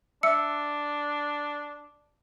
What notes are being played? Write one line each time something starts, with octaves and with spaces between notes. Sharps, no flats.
D4 E5 E6 C#7